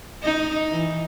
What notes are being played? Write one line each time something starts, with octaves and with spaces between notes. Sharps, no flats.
D#4
E3